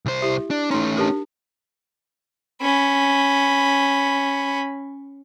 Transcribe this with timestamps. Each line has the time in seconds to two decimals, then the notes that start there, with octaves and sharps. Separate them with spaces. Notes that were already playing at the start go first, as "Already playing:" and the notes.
0.06 C2 C5
0.22 E4 G4 E5
0.50 D4
0.71 A3 C#4 D#4 A#5 C6
0.96 D4 G4 A#4
2.62 C#4 B5